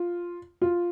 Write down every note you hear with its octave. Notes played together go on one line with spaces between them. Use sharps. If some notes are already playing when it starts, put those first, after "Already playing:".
Already playing: F4
F4